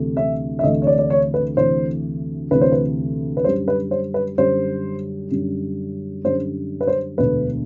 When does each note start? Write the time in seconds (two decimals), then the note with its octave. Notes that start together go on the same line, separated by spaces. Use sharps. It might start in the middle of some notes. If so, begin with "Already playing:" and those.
Already playing: D2 C3 E3 A3
0.17 E5
0.59 E5
0.63 D2 C3 E3 A3 D#5
0.82 C#5
0.87 D5
0.99 D5
1.10 C#5
1.34 B4
1.57 D2 C3 E3 A3 C5
2.51 D2 C3 E3 A3 B4
2.61 C5
2.72 B4
3.37 B4
3.44 F#2 D3 G3 C5
3.68 B4
3.91 C5
4.14 B4
4.38 F#2 D3 G3 C5
5.31 F#2 D3 G3
6.25 F#2 D3 G3 C5
6.81 B4
6.87 C5
7.18 E1 D2 D3 B4